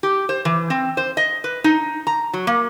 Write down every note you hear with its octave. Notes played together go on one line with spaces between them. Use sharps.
G4
C5
E3
C4
C5
D#5
B4
D#4
A#5
F#3
A#3